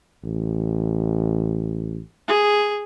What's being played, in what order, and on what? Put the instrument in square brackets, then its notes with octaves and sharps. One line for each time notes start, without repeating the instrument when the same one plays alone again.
[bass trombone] A1
[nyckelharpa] G#4